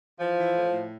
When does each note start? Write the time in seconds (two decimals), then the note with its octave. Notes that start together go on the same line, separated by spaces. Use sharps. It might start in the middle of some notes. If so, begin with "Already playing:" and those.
0.18 E3 F3
0.37 E3
0.54 A2
0.72 A2